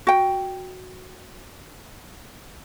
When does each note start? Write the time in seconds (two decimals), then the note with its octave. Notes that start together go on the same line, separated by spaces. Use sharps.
0.07 F#4 G5